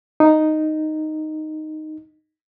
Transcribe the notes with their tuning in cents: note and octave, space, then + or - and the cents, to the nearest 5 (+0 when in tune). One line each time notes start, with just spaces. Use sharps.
D#4 -5